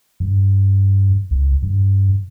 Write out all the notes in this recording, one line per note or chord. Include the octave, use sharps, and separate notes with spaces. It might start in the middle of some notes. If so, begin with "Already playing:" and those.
G2
C#2
G2